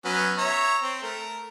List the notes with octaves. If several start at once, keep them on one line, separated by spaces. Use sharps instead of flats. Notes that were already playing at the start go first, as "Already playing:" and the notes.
F#3 B3 C#4
C#5 E5 A#5
C4
A3 A#4